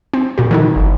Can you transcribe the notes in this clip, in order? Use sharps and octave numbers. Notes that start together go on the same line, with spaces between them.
C4
A#2 F#4
D3 D#3 D#4
G1